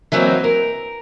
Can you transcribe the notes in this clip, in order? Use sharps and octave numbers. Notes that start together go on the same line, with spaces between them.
E3 F#3 A#3 C4 D#4 F#4
A#4